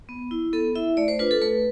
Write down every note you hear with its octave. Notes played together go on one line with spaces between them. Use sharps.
B3
E4
B3 A4
E4 E5
A3 D5
C5
D4 F4 B4
A4
A3 B4